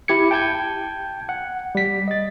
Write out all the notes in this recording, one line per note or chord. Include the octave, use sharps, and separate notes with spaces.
E4 G4 G#6 C#7
G5 A5 G6 G#6
F#5
G3 B6
D#5 A6